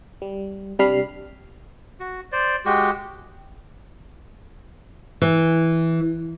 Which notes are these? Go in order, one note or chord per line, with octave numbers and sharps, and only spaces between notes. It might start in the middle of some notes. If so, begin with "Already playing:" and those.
G3
C3 G3 D4 B5 F6 C7
F#4
C5 D5
G#3 F#4 G4
E3